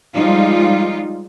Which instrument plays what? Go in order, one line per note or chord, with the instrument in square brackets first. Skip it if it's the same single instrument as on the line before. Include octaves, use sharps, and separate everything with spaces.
[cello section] F3 G3 G#3 D#4 F4